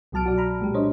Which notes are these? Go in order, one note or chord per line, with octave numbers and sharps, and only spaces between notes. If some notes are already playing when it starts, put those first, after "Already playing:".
C2 B2 F#3 A5 F6 D7
F#4 D5
A#5 B5 F6
A#2 G#3 G4
D4 C5 C#5 D#5